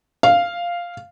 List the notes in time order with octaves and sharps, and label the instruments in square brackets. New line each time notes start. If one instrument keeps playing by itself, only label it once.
[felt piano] F5